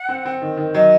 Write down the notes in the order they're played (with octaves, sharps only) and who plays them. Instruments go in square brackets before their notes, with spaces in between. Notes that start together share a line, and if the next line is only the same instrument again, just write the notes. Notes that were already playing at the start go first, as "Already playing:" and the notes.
Already playing: [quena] F#5
[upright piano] C4
C4
D#3
D#3
[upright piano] F#3 [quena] D#5